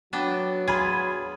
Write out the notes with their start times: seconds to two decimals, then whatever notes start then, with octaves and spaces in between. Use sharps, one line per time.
0.13 F#3 B3 D4 G5
0.68 F4 G#4 B5 G#6